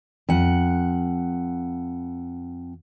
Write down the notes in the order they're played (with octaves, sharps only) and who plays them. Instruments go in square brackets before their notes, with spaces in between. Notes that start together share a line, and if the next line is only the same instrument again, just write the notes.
[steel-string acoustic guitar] F2 F#5